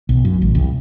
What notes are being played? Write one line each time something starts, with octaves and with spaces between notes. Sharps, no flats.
B1
F#2
A1
C2